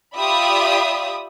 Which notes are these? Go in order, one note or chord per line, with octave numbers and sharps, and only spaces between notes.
F4 G4 D5 E5 B5 D#6